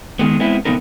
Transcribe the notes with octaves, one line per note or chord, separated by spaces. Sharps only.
D#3 G#3 B3
G#3 B3 C4 E4
C3 F3 A3 B3 D#4 A#4